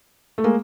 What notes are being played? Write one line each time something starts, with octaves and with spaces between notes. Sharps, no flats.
A3
G#3 A#3